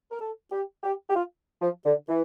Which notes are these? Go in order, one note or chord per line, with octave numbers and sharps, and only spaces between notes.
A#4
A4
G4
G4
G4
F4
F3
D3
E3